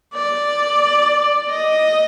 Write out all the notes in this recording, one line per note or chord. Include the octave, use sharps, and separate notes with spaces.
D5
D#5